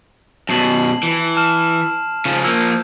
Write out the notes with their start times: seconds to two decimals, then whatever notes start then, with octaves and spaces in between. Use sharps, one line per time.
0.49 F#2 B2 A5 C7 F#7
1.03 E3
1.37 A5 F6 E7
2.25 C#3 F3
2.44 F3 A#3 E6 G6